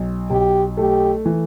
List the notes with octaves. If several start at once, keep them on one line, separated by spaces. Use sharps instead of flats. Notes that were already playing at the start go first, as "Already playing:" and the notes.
Already playing: B1
B1 G4
A3 G4
E3